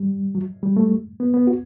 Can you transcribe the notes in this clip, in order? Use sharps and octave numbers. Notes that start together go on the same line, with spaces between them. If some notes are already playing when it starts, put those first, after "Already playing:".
Already playing: G3
F#3
G3
A3
B3
B3
F#4